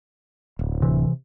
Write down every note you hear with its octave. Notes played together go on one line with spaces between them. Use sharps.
D1
C3 E3